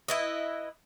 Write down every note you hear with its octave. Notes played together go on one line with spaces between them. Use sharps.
E4 B4 D#5